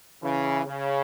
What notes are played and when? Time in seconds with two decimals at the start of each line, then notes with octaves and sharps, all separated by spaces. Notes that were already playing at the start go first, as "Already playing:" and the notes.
0.22 C#3 E3
0.66 C#3